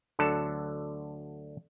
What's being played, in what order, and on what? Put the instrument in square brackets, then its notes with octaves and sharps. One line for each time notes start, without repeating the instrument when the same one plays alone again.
[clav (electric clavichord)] D2 D3 F#3 A4 A5